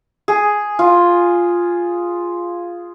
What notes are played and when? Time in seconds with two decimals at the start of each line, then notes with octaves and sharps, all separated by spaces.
0.28 G#4
0.79 F4